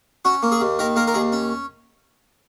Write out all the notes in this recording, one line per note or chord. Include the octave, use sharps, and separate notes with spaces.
C#4 F#4
A#3
G#4
D#2
D#3 A#4
A#3 A#4
A#4
D#2 G#4
C#4